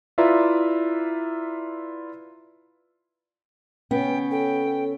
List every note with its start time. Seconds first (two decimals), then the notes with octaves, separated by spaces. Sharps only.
0.18 E4 F4 B4 D5 E5 A#5
3.91 B3 C#4 G5
4.31 A4 G5